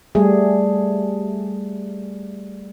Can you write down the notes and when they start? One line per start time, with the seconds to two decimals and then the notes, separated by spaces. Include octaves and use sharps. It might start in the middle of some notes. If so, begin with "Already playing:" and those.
0.15 G3 A3 G#4